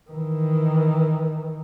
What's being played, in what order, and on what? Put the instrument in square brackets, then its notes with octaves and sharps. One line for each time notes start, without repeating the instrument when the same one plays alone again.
[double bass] D#3 E3